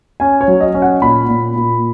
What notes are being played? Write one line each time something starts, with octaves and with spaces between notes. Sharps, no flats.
C#4 G#5
C#5
F#3
D#5
C#4
F#5
A#2 B5
A#2
A#2